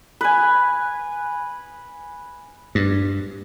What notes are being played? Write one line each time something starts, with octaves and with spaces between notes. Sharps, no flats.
B4 G#5
G2